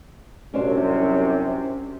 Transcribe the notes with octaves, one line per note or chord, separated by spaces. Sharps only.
C2 F#2 C3 C#4 D4 C5